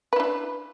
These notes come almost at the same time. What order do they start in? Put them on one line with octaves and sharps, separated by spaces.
B4 E4 D4